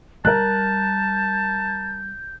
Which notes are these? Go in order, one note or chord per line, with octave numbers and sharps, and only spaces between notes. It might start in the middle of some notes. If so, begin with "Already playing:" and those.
G3 A#4 A5 F#6 G6